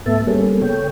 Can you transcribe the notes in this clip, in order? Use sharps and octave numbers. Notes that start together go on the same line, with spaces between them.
G#2 A3 B3 E5 A5
G3 A#3 B3 C#4 G#4 A4
C#3 A4 C#5 G5